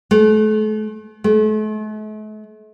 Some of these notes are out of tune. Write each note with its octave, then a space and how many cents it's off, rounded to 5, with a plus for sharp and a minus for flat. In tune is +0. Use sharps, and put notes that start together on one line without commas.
A3 -40
A3 -45